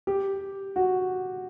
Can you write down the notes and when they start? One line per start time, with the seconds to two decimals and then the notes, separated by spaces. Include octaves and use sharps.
0.07 G4
0.76 F#4